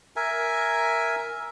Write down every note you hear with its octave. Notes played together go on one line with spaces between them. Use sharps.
A#4 E5 G#5